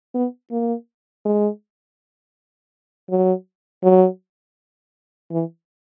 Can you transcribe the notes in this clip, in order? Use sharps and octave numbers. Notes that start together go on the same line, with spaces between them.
B3
A#3
G#3
F#3
F#3
E3